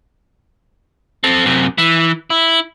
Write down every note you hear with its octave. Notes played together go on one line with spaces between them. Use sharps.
C4 A4
F#2 C3
E3
E4